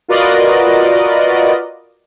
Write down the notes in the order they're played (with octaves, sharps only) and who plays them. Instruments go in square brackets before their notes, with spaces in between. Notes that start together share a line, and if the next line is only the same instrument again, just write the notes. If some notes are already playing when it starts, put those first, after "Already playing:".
[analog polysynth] F4 F#4 A#4 B4 D5 D#5